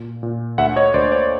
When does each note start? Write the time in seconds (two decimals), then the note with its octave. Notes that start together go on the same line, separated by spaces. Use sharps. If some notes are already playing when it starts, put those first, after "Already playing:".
Already playing: A#2
0.23 A#2
0.58 D2 E5 F#5
0.76 C#5 D#5
0.94 D2 C5 D5
1.12 C5 D5